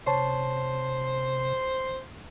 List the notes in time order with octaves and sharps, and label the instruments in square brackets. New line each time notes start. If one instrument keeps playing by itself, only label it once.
[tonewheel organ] C3 [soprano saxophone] C5 [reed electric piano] C#5 A5